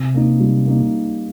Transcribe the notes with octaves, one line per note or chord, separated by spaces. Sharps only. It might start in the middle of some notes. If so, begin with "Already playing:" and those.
Already playing: C3
A#3 D#4
G3
A#3 D#4